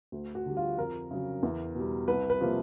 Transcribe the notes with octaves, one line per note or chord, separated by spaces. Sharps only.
D2
F#4
D3 G3
F4
F2 A#4
C#3 F#3
E2
B2 G3
C2 B4
B4
C3 F3 A#3